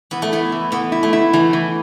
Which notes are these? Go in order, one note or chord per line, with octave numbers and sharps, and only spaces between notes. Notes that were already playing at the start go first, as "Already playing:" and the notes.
E3 B3
A3
B3 E4
E3
E3 B3
E4
A3
E4
E3 A3
E3